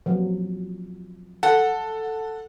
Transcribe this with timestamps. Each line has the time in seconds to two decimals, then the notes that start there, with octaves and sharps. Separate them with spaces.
0.06 F3 F#3
1.43 A4 F#5